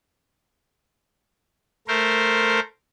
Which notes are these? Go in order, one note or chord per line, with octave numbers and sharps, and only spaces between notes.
A3 A#4 C5